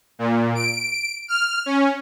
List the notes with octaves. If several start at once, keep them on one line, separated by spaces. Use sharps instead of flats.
A#2
D7
F6
C#4